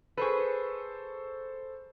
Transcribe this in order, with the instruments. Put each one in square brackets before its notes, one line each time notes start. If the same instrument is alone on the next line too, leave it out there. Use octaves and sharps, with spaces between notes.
[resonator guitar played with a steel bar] G#4 B4 [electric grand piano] A4 C5 C#6